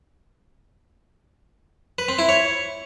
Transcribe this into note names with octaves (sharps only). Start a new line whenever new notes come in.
B4
C4
E4
C#5